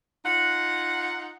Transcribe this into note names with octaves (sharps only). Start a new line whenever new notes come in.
D#4 F4 F#5